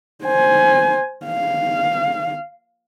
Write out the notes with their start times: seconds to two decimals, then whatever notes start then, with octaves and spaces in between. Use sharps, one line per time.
0.25 C5 G#5
1.26 F5